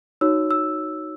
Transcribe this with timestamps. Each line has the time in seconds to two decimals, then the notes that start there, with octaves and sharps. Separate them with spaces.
0.21 D#4 F#4 C#5 E6
0.51 E6